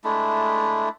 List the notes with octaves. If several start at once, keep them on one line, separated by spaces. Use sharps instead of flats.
G#3 A3 D4 E4